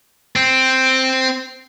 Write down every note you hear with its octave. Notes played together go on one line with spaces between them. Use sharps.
C4